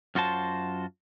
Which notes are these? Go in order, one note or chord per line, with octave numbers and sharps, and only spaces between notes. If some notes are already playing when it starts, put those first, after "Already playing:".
F#2 F4 F#4 C5 A5